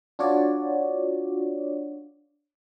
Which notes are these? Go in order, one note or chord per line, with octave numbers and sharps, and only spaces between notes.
D4 F4 F#4 C#5 D5